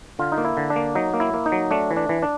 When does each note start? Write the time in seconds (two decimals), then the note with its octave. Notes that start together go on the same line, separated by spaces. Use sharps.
0.19 D3 F4
0.32 D#4
0.38 A#3
0.45 E4
0.57 D3
0.70 D4
0.76 A#3
0.95 F#3 D#4
1.14 A#3
1.20 E4
1.34 A#3
1.46 D#4
1.52 F#3
1.71 A3 D4
1.91 E3
1.97 D4
2.09 E3
2.23 D4